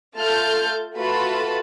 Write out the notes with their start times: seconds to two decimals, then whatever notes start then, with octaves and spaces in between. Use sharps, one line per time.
0.15 A3 F4 A4 A5 F6 G6
0.96 A3 F4 F#4 B4 A5 B5